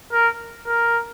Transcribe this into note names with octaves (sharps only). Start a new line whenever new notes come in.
A#4
A#4